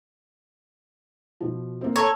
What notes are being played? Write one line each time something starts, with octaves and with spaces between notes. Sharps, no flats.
B2 F3
A#3 C4
A4 C#5 A#5